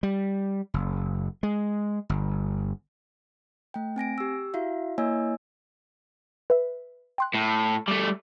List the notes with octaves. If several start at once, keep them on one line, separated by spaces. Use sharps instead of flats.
G3
F#1
G#3
G1
A3 G5
C4 G#5 A#6 D7
G4 E6
E4 F#4 E5 F5
A#3 E4 C#5 D#5 G#5 E6
B4 E5
G5 C6 F#6
A2
G3 A3